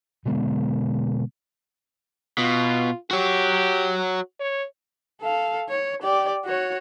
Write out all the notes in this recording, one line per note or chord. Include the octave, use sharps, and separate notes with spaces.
B2 D3 G#3 B3
B2 F4
F#4 G4 C#5
C#5
A4 F5
C#5
G4 D5
F#4 C#5